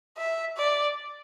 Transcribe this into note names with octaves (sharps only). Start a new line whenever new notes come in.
E5
D5